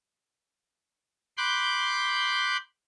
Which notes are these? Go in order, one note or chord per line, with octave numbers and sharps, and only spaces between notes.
B5 C6 D6 F#6 G6